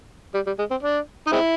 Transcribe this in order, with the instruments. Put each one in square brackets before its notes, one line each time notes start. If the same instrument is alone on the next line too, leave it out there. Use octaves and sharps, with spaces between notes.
[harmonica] G3
G3
G#3
C4
D4
D#4
G#3 C4 E4